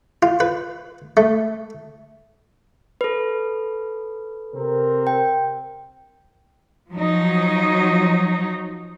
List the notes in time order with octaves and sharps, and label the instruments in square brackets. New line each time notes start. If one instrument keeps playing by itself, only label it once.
[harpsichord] F4
B4
A3
[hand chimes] A4 B4
[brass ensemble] C3 C4 A#4
[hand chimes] G5
[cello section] F3 F#3 D#4